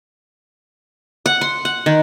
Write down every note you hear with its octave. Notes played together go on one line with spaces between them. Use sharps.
F#5
C6
F#5
D#3